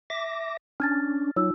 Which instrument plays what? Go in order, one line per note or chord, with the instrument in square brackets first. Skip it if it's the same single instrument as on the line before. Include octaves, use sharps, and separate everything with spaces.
[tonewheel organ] E5 D6 A#6
[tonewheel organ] C#4 D4 [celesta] F6 G#6 A6
[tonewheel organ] F#3 [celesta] D#4 F4 E6